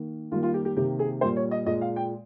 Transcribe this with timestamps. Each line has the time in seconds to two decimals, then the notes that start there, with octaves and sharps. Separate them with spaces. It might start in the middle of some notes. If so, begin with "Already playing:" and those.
Already playing: D#3 A#3
0.32 D#3 G3 A#3 F4
0.43 F4
0.54 G4
0.65 G4
0.76 C3 D#3 A#3 G4
0.99 G#4
1.21 A#2 G3 A#3 C5
1.36 C#5
1.51 D#5
1.66 A#2 G#3 D#5
1.81 F5
1.96 G5